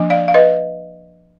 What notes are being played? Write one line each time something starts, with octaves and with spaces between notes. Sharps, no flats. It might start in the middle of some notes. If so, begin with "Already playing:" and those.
Already playing: F3 A#3 D4
D5 F5
F5
B4 D#5